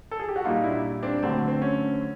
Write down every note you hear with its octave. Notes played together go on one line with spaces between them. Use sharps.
A4
G#4
G4
F#4
A#2 G3 A#3 D#4 F4
D4 E4
C4 D4
D3 F#3 A3 C4
C4
C#4